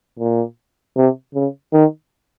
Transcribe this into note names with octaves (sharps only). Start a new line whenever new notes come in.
A#2
C3
C#3
D#3